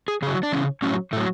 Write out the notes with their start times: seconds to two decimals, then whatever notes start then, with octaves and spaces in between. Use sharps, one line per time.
0.08 G#4
0.22 C#3 G#4
0.27 F#3
0.43 D4
0.52 C#3 E3 C#4
0.82 A2 F#3 C#4
1.13 A2 A3
1.17 F#3